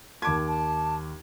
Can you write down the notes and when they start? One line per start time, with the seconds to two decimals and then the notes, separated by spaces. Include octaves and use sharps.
0.22 D#2 A5 D6 G#6
0.47 A5